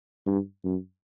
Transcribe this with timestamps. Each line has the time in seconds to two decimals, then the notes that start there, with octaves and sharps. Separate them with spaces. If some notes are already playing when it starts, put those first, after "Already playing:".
0.26 G2
0.64 F#2